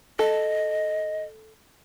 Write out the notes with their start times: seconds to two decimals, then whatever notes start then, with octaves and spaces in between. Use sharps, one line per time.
0.19 A4 D#5